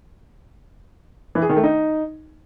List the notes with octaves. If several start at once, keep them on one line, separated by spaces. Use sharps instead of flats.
E3
G#4
D#3
A3
D#4